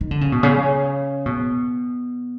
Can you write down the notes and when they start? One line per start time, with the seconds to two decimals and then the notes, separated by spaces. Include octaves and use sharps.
0.01 D#3
0.11 D3
0.21 C#3
0.32 B2
0.43 C#3
1.26 B2